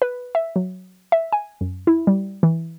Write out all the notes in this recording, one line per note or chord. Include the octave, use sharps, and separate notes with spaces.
B4
E5
F#3
E5
G#5
F#2
E4
G3
E3